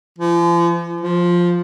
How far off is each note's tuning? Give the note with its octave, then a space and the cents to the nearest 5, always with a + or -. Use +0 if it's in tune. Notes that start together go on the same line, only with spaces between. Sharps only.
F3 -40
F3 +5